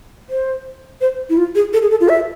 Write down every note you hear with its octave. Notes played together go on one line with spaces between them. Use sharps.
C5
C5
E4
F4
G#4
A4
G#4
A4
F4
E5